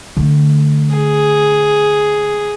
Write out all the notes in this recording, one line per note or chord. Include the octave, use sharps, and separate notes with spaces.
D3 A3
G#4